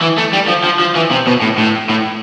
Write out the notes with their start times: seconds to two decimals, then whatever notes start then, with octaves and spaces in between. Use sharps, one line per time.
0.01 E3
0.18 A3
0.33 G3
0.48 F3
0.64 F3
0.80 F3
0.95 E3
1.11 C3
1.27 B2
1.41 A2
1.58 A2
1.89 A2